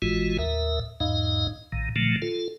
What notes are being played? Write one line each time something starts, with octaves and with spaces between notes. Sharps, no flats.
G#1 A2 E3 G#3 F4 F#4
D#2 A2 A#4 E5
E2 G#2 D#4 D#5 F5
A#1 A2 D#3
A#2 D3 D#3 F3 F#3 A3
F4 A4